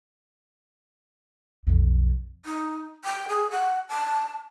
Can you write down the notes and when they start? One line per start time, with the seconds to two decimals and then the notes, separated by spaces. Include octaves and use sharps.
1.67 B1 F2
2.45 D#4
3.05 G5
3.29 G#4
3.51 F#5
3.89 A5